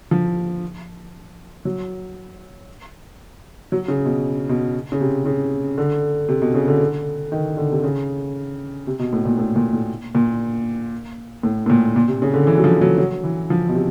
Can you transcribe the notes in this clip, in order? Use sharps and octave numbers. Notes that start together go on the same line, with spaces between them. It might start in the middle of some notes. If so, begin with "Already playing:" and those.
F3
F#3
F#3
C#3
B2
B2
C#3
C3
C#3
D3
C3
B2
C#3
D3
D#3
D3
C3
C#3
C3
B2
A2
A#2
A2
A#2
A2
A#2
A2
A2
A#2
A#2
C3
C#3
D3
E3
F#3
F3
F#3
F#3
E3
F3
B2
C3